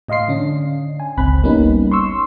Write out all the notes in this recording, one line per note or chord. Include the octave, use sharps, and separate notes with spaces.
A2 D#5 F5 C6 C7
D3 C#4 D4
G#5
G1 C#2 C4 B5 F#6
G3 A#3 B3 C#4 D#4
C6 C#6 E6